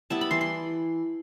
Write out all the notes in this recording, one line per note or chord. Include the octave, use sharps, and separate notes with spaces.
G3 B3 E4 A5
B5
E3 C6
C6